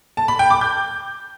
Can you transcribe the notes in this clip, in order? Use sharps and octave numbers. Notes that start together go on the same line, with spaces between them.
A5
B5
G5
D6
G6